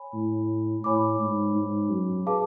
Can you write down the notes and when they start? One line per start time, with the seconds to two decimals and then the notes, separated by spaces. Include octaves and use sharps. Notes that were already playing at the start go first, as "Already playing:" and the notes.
Already playing: C#5 G#5 B5
0.13 A2
0.84 A2 C#5 G#5 B5 D6
1.20 G#2
1.55 G#2
1.91 F#2
2.27 G#4 B4 F5 A5 D6